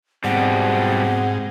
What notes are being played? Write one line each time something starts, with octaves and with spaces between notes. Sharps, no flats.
G#2 B2 G3 C4 F#5